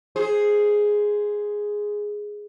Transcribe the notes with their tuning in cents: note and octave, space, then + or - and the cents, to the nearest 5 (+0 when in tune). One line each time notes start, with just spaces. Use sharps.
G#4 +0 C5 +0